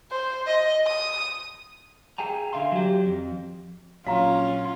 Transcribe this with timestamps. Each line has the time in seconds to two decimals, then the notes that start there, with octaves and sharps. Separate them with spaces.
0.11 C5
0.47 D#5
0.87 D#6
2.18 G#4 G5 G#5 A#5
2.53 D3 E5 F5 C6
2.72 F#3 G4
3.06 F2
4.06 A#1 F#3 C#4 F4 F5 A#5